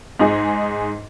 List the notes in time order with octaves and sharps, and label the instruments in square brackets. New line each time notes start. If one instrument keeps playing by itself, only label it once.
[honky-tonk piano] G#2 D#4 G#4